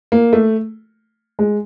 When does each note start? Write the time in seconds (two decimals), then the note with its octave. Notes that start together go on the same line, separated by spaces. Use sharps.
0.12 A#3
0.33 A3
1.39 G#3